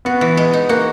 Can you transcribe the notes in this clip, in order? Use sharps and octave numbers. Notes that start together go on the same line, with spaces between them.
B3 F#4
E3
G#3
D#4
A#3 F#4